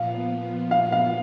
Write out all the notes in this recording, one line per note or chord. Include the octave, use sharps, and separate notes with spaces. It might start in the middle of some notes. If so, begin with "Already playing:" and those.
Already playing: A#2 F3 B3 F5
F5
F5